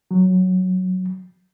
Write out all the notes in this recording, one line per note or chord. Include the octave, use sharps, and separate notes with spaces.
F#3